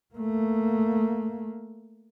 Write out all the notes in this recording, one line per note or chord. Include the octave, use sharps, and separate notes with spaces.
A3 A#3